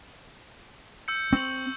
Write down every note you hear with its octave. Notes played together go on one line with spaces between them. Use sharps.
E6 G6 C#7
C4 C#6 F#7